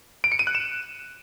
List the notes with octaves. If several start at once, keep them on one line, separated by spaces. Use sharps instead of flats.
D7
C#7
D#7
F#6
E7